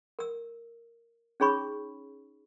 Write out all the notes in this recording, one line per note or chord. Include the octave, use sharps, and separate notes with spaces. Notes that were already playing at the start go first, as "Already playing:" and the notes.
A#4 E6
C#4 D#4 G#4 C#5 B5 C#6